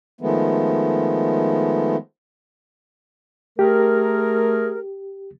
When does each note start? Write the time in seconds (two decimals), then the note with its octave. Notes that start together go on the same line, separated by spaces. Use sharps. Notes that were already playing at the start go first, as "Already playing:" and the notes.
0.21 D#3 F3 G#3 A3 B3
3.59 A3 G4 G#4 A#4